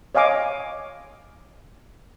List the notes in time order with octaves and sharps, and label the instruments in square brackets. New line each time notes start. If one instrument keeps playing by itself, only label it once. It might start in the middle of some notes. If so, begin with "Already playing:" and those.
[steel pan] C#5 D#5 F5 G#5 D6